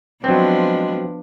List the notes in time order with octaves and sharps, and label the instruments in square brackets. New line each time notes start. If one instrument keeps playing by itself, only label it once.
[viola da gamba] F3 B3 D4 [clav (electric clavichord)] F#3 C4 [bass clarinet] G#3